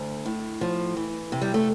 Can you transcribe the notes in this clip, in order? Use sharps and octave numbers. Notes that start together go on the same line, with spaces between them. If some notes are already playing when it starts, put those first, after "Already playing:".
Already playing: D2
A2
F3
E3
C3
G3
A3